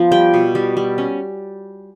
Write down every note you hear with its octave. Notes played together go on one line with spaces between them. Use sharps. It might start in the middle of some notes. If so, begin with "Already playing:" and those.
Already playing: F3 B3
G3 G5
B2
G3
G3
C#4